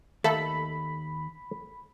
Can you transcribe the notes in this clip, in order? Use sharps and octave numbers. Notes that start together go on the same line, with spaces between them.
D#2 A3 A#3 A4 A5 B5